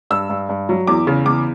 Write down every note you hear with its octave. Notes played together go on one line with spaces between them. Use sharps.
G2 E6
G2
G2
F#3
E2 D6
C#3
E2 D6